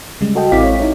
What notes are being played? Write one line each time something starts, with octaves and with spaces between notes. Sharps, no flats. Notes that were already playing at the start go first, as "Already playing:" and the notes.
C#3 G3 G#3
F#4 A4 D#5 G5
A1 C4 E4 F5 D6 B6
C#5
D#4 E4 C#5